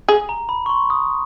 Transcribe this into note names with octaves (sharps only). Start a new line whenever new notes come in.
G#4
A#5
B5
C#6
C6
D#6